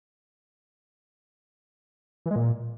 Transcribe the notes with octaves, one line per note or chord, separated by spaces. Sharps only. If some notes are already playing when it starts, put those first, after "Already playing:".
E3
G#3
A#2